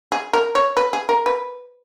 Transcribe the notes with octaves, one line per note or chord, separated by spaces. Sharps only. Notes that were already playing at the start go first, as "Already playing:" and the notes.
G#4
A#4
C#5
B4
G#4
A#4
B4